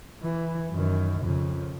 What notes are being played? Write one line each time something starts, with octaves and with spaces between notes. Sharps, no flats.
E3
F#2 D#3
F2 C#3